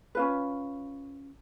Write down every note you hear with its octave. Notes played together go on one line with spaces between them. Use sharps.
C#4 F4 B4